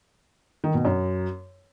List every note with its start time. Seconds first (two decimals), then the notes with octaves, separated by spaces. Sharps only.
0.64 D#3
0.74 B2
0.85 F#2